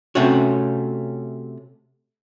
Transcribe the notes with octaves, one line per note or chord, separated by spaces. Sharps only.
C3 A3 C#4 F#4